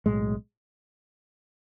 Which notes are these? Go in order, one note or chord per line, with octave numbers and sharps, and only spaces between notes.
B1 A2 G#3